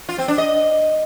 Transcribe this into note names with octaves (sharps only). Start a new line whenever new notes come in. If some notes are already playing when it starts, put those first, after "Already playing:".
F4
C4
D4
D#5